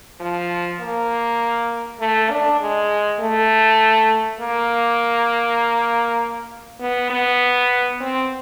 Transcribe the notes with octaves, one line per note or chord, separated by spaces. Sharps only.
F3
A#3
A3
D4
G#3
A3
A#3
B3
B3
C4